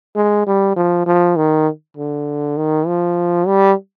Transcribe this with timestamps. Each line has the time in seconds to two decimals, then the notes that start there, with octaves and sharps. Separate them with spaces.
0.16 G#3
0.47 G3
0.76 F3
1.06 F3
1.36 D#3
1.97 D3
2.57 D#3
2.87 F3
3.47 G3